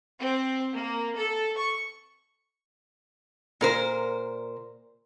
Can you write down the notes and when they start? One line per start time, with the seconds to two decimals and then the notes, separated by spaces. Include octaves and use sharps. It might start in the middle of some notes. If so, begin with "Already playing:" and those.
0.20 C4
0.73 A#3
1.17 A4
1.57 C#6
3.61 A#2 A#4 C5